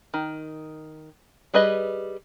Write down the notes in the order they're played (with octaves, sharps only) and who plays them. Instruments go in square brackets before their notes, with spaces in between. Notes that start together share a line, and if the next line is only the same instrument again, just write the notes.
[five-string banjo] D#3
G3 G#4 B4 D#5